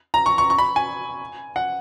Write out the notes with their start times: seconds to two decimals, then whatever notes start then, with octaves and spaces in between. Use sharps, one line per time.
0.14 A#5
0.26 C#6
0.38 C#6
0.50 C#6
0.58 B5
0.76 G#5
1.56 F#5